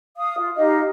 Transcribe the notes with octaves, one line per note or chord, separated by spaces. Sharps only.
F5 D#6
F4
D#4 G4 D#5 F5